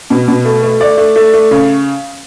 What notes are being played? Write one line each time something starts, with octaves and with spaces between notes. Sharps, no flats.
B2
B2
A3
A3
A3 D5
A3
A3
A3
C#3